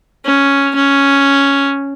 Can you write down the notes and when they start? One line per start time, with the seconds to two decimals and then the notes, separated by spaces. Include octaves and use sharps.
0.25 C#4
0.75 C#4